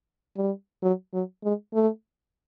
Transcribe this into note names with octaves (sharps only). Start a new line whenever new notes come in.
G3
F#3
F#3
G#3
A3